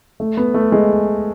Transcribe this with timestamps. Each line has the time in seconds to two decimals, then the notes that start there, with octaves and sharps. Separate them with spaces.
0.20 A3
0.37 B3
0.54 A3
0.72 G#3